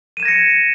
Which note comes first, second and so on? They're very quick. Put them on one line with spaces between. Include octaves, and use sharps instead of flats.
D#7 E7 G#6 A#6 C#7